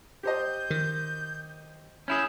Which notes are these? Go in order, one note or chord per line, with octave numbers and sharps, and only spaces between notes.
G4 C5 D#5 G6
D#3
C#4 E4 G#4 G6